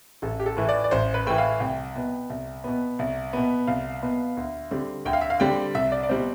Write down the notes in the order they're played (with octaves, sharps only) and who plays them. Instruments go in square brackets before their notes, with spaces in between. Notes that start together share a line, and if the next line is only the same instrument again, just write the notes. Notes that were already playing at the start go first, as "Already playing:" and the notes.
[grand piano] A1 A4
G4
A4
A2 E3
D5
D5
A1 C5
B4
A2 E3 G5
F5
C2 G5
B2 B3
C2
B2 B3
C2
B2 B3
C2 F5
B2 B3
D2
D3 G3 C4
D2 G5
F5
E5
F5
D3 G3 C4 G5
C2 E5
D5
D5
B2 G3 C4 C5